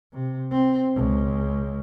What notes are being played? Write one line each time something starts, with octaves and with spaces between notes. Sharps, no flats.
C3
C4
C#2